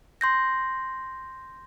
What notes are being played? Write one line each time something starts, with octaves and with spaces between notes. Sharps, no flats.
C6 G6 A#6